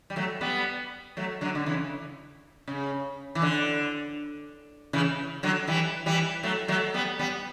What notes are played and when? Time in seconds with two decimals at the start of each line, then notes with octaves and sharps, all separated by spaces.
0.10 G3
0.16 F#3 A3
0.41 G3 B3
1.17 F#3 A3
1.41 D3 F#3
1.55 D3
1.66 C#3 E3
2.68 C#3
3.35 E3
3.42 D3
4.93 C#3 E3
5.43 D3 F#3
5.68 E3 G3
6.06 E3 G3
6.43 F#3 A3
6.68 F#3 A3
6.94 G3 B3
7.19 G3 B3